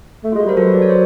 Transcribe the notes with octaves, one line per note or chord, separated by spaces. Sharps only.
A3
F4
G#3
F#4
G3 A#4 C5
F#3 A4 B4
D5
C#5
C5